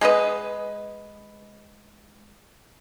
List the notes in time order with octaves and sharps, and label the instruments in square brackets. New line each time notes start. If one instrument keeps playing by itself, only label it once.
[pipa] G#3 B3 B4 D#5